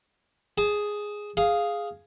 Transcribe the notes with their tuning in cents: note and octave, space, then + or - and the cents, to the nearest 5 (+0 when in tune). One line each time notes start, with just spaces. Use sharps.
G#4 +0 A5 -30
G#4 +0 F5 +0